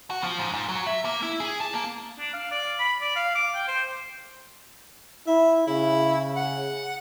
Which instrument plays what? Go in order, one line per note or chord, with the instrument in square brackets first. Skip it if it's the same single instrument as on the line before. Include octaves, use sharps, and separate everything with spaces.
[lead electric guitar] F#4
F3
G#2
G#2
F#3
E5
A#3
E4
G#4
A5
A#3
[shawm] D4
F5
D5
B5
D5
F5
D6
G5
C5
[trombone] E4 [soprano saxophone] E5
[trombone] C#3 [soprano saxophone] E4
[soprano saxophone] F#5